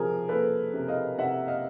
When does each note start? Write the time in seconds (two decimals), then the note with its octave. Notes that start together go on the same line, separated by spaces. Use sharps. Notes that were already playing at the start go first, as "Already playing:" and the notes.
Already playing: C3 F3 G#4 A#4
0.28 A#3 A4 B4
0.73 C3
0.88 D#5 F5
1.18 C3 E5 F#5
1.48 D#5 F5